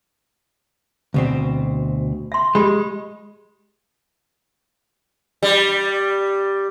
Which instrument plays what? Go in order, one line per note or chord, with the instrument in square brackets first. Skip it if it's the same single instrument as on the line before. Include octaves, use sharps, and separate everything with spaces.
[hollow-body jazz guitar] D2 B2 C4
[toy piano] E5 C6
[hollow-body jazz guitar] G#3 [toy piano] G4 B5
[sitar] G3